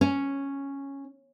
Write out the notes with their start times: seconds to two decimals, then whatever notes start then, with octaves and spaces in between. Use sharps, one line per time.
0.01 C#4